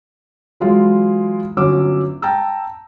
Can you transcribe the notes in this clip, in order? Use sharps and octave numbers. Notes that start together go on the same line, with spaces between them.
E3 F#3 G#3 E4 F4
G1 F#3 C#4 D6 E6
G5 A5 A#5 E6